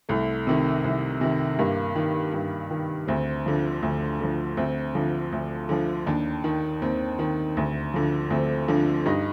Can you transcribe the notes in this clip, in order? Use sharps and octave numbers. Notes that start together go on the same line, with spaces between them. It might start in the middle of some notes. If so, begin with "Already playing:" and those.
C2 A3
C3 D#3
C2
C3 D#3
G2 A#3
D#3
G2
D#3
D2 C4
D3 F3
D2
D3 F3
D2 C4
D3 F3
D2
D3 F3
D#2 D4
D#3
D#2 C4
D#3
D2
D3 F3
D2 C4
D3 F3 D4
G2 D#4